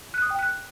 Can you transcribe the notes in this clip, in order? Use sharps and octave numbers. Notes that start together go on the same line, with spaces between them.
F#6
D#6
G5
F#6